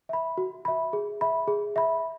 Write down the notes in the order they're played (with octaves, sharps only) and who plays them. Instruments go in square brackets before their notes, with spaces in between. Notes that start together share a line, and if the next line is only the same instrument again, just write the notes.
[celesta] E5 B5
F#4
E5 B5
G#4
E5 B5
G#4
E5 B5